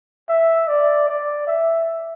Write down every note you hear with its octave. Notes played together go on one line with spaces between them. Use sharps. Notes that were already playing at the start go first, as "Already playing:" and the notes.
E5
D5
D5
E5